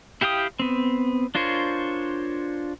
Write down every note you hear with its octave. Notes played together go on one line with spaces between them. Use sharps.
E4 G4 F5 G5 D#6
B3 C4
D4 F4 A#4 C5 C#5